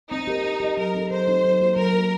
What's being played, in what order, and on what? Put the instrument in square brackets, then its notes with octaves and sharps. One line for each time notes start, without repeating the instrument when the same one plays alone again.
[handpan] C4 [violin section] D#4
[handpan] G4 A#4 D#5
C4
G4 A#4 D#5
[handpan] F#3 [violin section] A#4
[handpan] C4 D#4 A4
[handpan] F#3 [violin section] C5
[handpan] C4 D#4 A4
F#3
A#3 F#4
[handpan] F#3 [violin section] A#4
[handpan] A#3 F#4